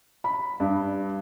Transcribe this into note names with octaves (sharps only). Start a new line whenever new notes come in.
B5
G2